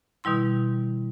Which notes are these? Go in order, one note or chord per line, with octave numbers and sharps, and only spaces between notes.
B2 D#3 G3 E4 C6